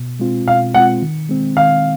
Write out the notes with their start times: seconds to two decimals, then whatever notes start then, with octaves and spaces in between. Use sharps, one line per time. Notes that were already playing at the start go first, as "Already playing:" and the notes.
Already playing: B2
0.19 G#3 C4 F4
0.47 B2 F5
0.74 G#3 C4 F4 F#5
1.02 D#3
1.29 G#3 C4
1.57 D#3 F5